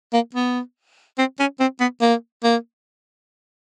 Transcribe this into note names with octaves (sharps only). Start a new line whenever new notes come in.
A#3
B3
C4
C#4
C4
B3
A#3
A#3